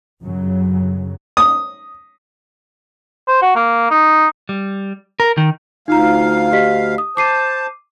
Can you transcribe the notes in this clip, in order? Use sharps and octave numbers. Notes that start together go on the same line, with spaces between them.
G1 F#2 C#3 F#3
D#6
C5
F#4
A#3
D#4
G3
A#4
D#3
D2 D#4 F4 F5 A#5
G4 D#5 B6
D#6
C5 A5 D6 C7 D#7